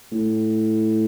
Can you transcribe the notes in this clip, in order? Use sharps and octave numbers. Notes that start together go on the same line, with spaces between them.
A2